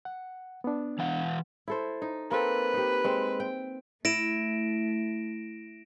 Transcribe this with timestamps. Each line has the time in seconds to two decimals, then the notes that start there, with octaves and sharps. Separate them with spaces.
0.05 F#5
0.64 B3 D4
0.99 E3 F5 F#5
1.68 E4 A4 C5
2.02 D#4
2.31 A#3 C4 A4 B4
2.74 D#4 G4
3.04 G#3 C4
3.40 G5
4.05 A3 E4 A#6 D7 E7